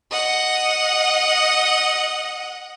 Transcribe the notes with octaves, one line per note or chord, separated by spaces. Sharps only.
D#5 F#5